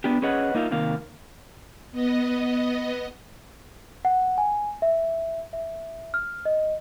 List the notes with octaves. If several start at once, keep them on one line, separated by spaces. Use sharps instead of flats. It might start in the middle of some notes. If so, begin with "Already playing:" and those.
B3 D4 G4
C#4 G#4 B4 C#5 D#5 F#5
A#3 D#4 F4 E5 F5
C3 D#3 A#3 F5
B3 D#5
F#5
G#5
E5
E5
F6
D#5